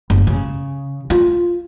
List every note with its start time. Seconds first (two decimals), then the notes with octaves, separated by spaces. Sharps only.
0.10 F#1
0.27 C#3
1.10 F4